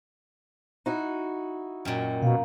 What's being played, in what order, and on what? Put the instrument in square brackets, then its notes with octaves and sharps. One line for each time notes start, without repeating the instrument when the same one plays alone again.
[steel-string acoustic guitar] D#4 E4 F#4
[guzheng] F#2 A#2 [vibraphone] D#5 G5
[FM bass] B2 [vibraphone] F5 A#5